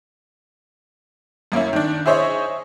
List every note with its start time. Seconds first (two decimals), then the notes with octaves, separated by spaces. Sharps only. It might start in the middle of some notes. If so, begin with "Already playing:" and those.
1.52 F#2 A#3 C#4 E4
1.73 D#3 D4
2.06 E4 G#4 C5 C#5 D#5 E5